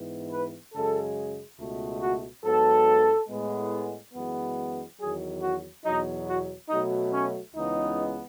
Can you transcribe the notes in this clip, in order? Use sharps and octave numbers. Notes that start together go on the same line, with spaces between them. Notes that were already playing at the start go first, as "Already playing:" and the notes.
Already playing: G#2 E3 B3
B4
F#2 C#3 G#3 A4
C#2 B2 A3
F#4
G#2 F#3 B3 A4
A2 G#3 B3
F#2 E3 G#3 B3
E2 D#3 F#3 G#4
F#4
E2 B2 F#3 D#4
F#4
B2 F#3 A3 D#4
C#4
C#2 C#3 E3 G#3 B3 D#4